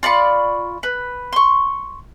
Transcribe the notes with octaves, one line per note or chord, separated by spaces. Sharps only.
F4 D5 B5 C#6
B4
C6 C#6